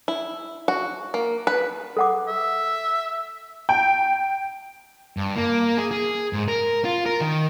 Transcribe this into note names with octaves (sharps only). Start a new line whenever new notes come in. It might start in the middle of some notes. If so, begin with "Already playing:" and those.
E4
F#4
A#3
B4
A4 F#5 D6
E5
G5
G2
A#3
G#4
G#4
G#2
A#4
F4
A#4
D#3